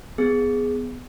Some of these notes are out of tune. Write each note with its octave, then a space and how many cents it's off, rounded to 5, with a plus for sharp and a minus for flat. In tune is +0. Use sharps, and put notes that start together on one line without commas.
B3 +10 G#4 +0